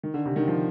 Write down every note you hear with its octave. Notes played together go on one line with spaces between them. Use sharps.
D#3
D3
C3
D#3
F3